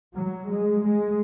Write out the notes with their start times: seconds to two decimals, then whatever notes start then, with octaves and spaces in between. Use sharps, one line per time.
0.15 F#3
0.49 G#3
0.83 G#3